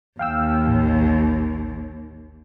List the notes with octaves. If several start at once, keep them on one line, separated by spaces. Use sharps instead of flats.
D#2 F5 G5 E6
A1